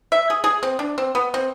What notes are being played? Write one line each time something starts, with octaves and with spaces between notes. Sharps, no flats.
E5
G#4
G#4
C4
D4
C4
B3
C4